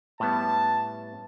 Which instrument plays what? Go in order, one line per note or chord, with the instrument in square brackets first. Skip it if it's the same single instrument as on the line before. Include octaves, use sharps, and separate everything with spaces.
[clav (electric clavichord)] A2 G3 B3 [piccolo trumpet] A5